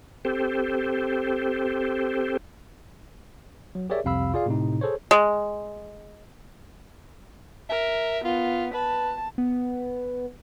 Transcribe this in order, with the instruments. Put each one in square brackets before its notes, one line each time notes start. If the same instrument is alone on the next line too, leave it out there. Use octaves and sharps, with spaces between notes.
[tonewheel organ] C4 G4 A4 C5
[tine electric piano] F#3
G4 G#4 A#4 C#5 D5 E5
C2 F2 C3 F5 B5 E6
F4 G#4 D5 F5
A2 C3 D#4
G#4 A4 C5 C#5
[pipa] G#3
[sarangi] A#4 [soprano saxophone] E5
[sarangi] B3 [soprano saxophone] F4
[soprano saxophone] B4 [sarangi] A5
[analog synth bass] B3